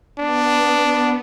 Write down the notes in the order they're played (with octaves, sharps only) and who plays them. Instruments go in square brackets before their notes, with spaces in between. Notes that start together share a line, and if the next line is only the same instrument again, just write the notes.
[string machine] B3 [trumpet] D4